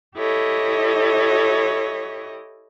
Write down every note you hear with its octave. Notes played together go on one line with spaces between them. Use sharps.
E4 G4 A4 C#5 D#5